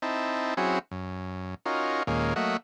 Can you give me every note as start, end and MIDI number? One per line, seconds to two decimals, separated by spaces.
0.02 0.54 60
0.02 0.54 63
0.02 0.54 64
0.02 0.54 81
0.57 0.79 54
0.57 0.79 60
0.57 0.79 61
0.57 0.79 64
0.57 0.79 66
0.57 0.79 68
0.91 1.55 42
1.66 2.03 61
1.66 2.03 63
1.66 2.03 65
1.66 2.03 66
1.66 2.03 70
2.07 2.34 39
2.07 2.34 46
2.07 2.34 56
2.07 2.34 58
2.07 2.34 61
2.36 2.57 54
2.36 2.57 57
2.36 2.57 58
2.36 2.57 75
2.36 2.57 76
2.36 2.57 78